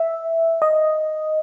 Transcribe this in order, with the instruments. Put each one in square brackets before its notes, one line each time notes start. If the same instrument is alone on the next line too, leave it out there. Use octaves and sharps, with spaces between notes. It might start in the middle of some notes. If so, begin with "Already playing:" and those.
Already playing: [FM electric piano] E5
D#5